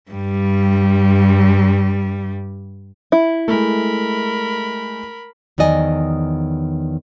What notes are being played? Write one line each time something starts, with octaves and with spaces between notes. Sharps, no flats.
G2 G3
E4
G#3 A3 A#4 B5
E2 D#3 F#3 D5 D#5 G#5